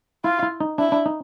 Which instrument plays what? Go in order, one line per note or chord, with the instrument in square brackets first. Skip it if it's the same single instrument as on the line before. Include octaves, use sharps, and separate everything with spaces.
[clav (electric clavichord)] E4 [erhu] F4
[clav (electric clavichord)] E4
D#4
[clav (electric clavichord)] D4 [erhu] E4
[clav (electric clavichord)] D4
D#4